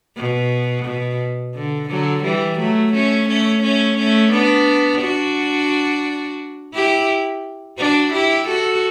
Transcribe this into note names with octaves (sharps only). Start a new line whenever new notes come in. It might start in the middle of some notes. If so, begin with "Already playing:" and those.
B2
B2
D3
D3 F#3
E3 G3
F#3 A3
A3 C#4
A3 C#4
A3 C#4
A3 C#4
B3 D4
D4 F#4
E4 G4
D4 F#4
E4 G4
F#4 A4